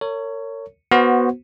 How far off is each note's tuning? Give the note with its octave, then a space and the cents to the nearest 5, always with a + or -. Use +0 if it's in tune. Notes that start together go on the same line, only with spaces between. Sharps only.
A#4 -40 C#5 +10
B3 -15 F#4 +0 C5 +0